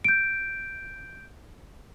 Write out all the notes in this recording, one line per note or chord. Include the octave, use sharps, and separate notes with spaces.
G6 D7